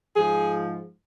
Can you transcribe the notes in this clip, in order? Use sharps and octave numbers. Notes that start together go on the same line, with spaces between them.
G#2 F3 G#4